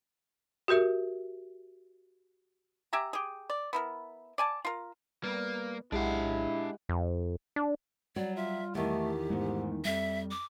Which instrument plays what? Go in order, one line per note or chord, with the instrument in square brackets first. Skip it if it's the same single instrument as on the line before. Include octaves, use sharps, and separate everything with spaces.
[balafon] F#4 G4 A#4 E5
[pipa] G4 E5 G#5 A#5
G4 G#4
D5
B3 E4 A#4
D5 G#5 A5
F4 A#4
[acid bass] G3 [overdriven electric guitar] A#3 [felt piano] B3
[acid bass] B1 [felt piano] G#3 G4 F#5 [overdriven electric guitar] D4 F5 [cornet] E4
[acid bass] F2
D4
[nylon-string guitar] F#3 [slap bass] G3 [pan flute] D5
[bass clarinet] F4 [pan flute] E5
[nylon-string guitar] E2 D#3 [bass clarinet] A3 [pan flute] G4
[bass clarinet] G#2 [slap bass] G#3 A3 B3
[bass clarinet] F2 [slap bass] G3 [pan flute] E5
[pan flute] D6